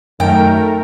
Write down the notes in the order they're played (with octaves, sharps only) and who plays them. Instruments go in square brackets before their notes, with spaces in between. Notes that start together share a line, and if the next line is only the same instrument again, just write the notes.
[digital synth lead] F#2 [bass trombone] D#3 [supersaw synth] A3 A#4 [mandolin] G5